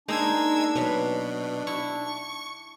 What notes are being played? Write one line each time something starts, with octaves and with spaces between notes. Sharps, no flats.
G#3 A#3 D4 D#4 G#4 E6 G#6
B2 F#3 B3 B4
E4 C#6